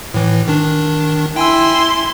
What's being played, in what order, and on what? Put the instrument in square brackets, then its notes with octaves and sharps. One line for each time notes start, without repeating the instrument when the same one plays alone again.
[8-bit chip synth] A2 E3
D#3 D4
[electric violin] E4 C6 [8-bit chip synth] G5 G#5 E6